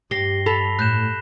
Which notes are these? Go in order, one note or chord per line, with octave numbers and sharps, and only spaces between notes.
G2 G4 A#6 C7 G7
A4 B5 B6 F7
A2 F#6 G6 E7